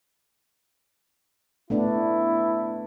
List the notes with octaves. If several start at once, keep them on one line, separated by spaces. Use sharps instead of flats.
A3 B3 D4 E4